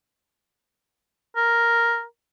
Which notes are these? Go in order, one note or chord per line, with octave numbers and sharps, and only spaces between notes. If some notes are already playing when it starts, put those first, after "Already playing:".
A#4